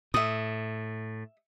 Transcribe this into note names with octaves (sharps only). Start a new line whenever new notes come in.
A2 E5 D#6